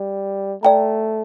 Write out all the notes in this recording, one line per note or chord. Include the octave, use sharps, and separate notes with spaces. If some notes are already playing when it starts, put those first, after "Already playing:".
Already playing: G3
A3 D5 G5 A#5